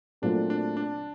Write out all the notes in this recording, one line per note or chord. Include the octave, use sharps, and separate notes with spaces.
A#2 F#3 A3 C4 D4 F4
D4
D4